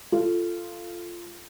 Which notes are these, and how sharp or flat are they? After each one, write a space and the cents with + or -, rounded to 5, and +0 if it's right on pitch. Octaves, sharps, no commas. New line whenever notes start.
F4 -10 A4 +0